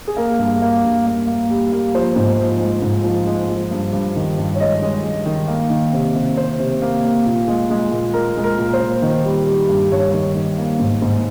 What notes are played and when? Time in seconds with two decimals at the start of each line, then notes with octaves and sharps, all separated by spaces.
0.08 G#4
0.17 A#3 A#4
0.39 G2
0.62 A#3
0.84 G2
1.06 A#3
1.27 A#3
1.50 G3
1.72 A#3
1.95 F3 C5
2.16 G#2
2.38 F3
2.60 G#3
2.82 G#2
3.04 F3
3.26 G#3
3.50 F3
3.71 G2
3.93 G2
4.16 D#3
4.38 G2
4.55 C#5
4.60 G#3 D#5
4.82 G#3
5.04 G#3
5.26 D#3
5.48 A#3
5.70 D#3
5.93 C3
6.15 C3
6.37 C3 C5
6.60 C3
6.82 A#3
7.04 A#3
7.26 A#2
7.48 G#3
7.70 G#3
7.91 A#2
8.14 G#3 A#4
8.37 G#3
8.44 A#4
8.59 A#2
8.73 C5
8.81 A#2
9.02 D#3
9.25 G3
9.46 G3
9.69 G2
9.92 G2 C#5
10.13 D#3
10.35 D#3
10.58 A#3
10.80 G#2
11.02 G#2